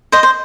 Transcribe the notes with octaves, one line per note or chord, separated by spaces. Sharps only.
C5 D#5
C5